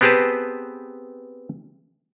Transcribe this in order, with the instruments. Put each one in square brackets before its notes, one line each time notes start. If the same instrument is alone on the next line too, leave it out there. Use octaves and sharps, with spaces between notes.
[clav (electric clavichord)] B3 C4 G4 G#4 B4 A5